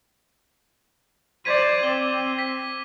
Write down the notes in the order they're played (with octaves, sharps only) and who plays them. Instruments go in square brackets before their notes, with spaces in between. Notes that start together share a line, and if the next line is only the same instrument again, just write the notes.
[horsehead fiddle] C5 D5 [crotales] G#6 B6 D#7
[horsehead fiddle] C4 [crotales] D6 G7
[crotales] B6